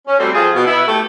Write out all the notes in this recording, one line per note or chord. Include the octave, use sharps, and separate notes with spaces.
C#4
F#3 G3 A3 C4
F3 C4 F4 G#4
B2
B3 E4
A3 F#4 G4 A4